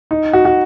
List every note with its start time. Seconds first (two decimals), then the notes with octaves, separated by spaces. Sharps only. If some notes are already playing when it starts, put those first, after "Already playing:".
0.11 D#4
0.33 F#4
0.45 F#4